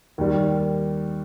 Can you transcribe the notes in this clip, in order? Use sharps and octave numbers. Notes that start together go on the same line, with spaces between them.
D#2 D#3 G3